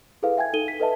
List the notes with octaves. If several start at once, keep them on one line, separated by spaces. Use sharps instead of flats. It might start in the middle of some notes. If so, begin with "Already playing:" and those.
E4 G#4 A4 B4 F5
E5 G5 G#5 G#6
D#4 A4 D#7 G7
B6
A4 B4 D#5 E5 A5